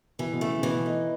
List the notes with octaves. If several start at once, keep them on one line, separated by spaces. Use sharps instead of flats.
B2 E3
B2
C#3 A3
C#3
B2 E3
D#4